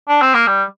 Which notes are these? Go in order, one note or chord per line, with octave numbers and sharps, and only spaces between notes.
D4
C4
A#3
G3